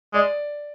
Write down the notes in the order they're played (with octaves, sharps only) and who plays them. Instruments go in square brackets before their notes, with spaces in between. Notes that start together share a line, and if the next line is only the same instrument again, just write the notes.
[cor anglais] G#3 [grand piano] D5